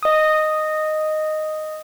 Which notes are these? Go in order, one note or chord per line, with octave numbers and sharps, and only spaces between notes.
D#5 D#6